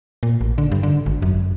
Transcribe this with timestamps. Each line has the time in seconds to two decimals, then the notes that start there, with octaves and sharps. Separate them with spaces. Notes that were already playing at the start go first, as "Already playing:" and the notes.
0.23 A#2
0.41 A1
0.58 D3
0.72 G2
0.83 D3
1.06 G#1
1.22 F#2